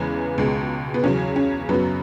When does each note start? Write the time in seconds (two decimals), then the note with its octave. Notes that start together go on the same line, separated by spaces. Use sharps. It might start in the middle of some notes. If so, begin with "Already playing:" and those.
Already playing: E2 C#3 E3 G#3 B3
0.38 C#2 B2 G#3
0.94 B3
1.03 E2 C#3 F#3 C#4
1.36 C#4
1.69 F#2 F#3 B3